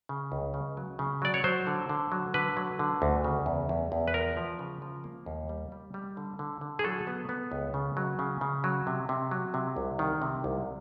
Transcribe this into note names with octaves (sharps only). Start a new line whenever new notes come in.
C#3
C#2
C#3
F#3
C#3
F#3 D5
C#5
F#3 C5
D3
D3
F#3
D3 B4
F#3
D3
D2
C#3
E2
E2
E2
B4
F3 A#4
F3
C#3
F3
A#3
D#2
G3
G3
G3
D3
D3
D3
G#4
F#3 A4
B3
B3
C#2
C#3
F#3
C#3
C#3
F#3
C3
C3
F#3
C3
C2
D#3
C3
C2